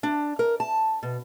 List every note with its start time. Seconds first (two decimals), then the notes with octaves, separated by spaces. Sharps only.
0.03 D4
0.39 A#4
0.60 A5
1.03 B2